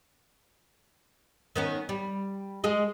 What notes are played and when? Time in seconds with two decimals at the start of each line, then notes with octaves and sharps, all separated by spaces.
1.55 D#3 B3 C#4
1.89 G3
2.64 G#3 G#4 D#5